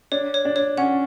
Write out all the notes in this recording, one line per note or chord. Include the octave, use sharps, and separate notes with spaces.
D4 C#5
C#5
D4
C#5
C#4 F#5